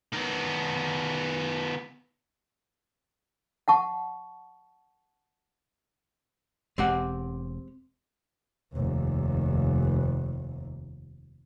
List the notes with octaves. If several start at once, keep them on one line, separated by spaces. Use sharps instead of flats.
D#3 B3
F#5 A5 C#6
E1 G#3 C4 G4 F#5
F1 D#2